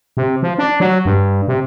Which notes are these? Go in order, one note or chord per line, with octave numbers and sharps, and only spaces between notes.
C3
F3
D4
F#3
G2
C3